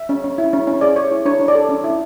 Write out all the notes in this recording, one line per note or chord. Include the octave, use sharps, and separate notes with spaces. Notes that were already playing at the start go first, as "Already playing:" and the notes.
Already playing: E5
C#4
C#4
E4
C#4
C#4
G#4 D5
C#5
E4
D4 C#5
D4
D5
A4
C#4
E4